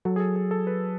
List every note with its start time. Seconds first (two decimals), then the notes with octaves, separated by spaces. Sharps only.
0.05 F#3 A4
0.16 G#4
0.20 A4
0.36 G#4
0.51 A4
0.67 B4